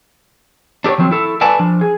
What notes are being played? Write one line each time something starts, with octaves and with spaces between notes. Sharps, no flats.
D4 G4 A#4 C#5
D#3 F3 F#3 C4
E4 A4
A4 B4 D5 G#5 A5
F3 D4
G#4